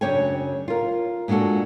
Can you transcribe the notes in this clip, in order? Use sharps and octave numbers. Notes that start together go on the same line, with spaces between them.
F#2 C#3 D4 C#5 G5 G#5
F4 A#4
A#2 G#3 D4 F#4 A4